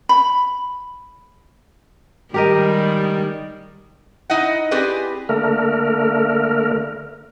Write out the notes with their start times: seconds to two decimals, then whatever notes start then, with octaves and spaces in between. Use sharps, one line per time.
0.09 B5
2.34 D#3 G3 G#3 G4 A#4 D#5
4.30 D#4 E4 D#5 F#5
4.71 C4 E4 G4 G#4 B4 D5
5.29 D3 A3 A#3 A#4